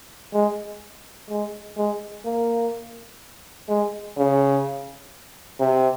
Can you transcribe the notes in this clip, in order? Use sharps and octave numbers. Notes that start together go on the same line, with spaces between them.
G#3
G#3
G#3
A#3
G#3
C#3
C3